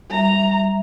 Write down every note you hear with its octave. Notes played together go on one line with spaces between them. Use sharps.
G3 E5 A#5